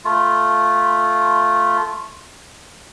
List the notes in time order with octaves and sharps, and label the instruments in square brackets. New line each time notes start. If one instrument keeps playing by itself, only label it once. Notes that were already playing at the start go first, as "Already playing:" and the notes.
[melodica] A3 F4